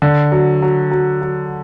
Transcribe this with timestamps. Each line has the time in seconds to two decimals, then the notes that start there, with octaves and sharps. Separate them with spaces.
0.02 D3
0.32 F#3
0.62 F#3
0.91 F#3
1.22 F#3